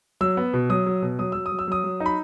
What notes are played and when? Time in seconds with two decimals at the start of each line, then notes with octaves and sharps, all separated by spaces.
0.21 F#3 E6
0.37 B3
0.53 B2
0.70 F#3 D#6
0.86 F#3
1.02 B2
1.19 F#3 D#6
1.32 F#3 E6
1.46 D#6
1.52 F#3
1.59 E6
1.68 F#3 D#6
1.84 F#3
2.00 D#4
2.06 B5